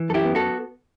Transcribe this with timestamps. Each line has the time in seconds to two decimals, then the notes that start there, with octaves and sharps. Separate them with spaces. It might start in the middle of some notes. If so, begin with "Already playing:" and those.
Already playing: E3
0.09 F#2 A4
0.14 E4 G4
0.25 B3
0.35 F#4 A4